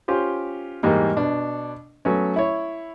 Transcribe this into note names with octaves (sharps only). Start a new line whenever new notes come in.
C#4 F4 G4 C5
E2 G#2 G3 A#3
B2 D4
F#3 A3 B3 C#4
E4 C#5